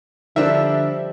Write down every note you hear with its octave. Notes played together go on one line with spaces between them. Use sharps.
D3 F3 G3 D4 F4 A#4 E5